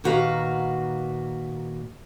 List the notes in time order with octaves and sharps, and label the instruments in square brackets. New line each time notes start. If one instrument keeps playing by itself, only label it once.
[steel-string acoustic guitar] A#2 D#3 F#4 B4 F5 A#5